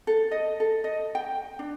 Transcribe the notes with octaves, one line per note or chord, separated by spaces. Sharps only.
A4
D#5
A4
D#5
G5
D4